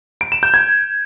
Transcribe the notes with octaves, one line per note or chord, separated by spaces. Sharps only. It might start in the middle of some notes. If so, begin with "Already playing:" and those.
D7
E7
G6
G#6